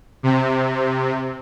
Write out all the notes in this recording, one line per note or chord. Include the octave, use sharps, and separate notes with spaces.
C3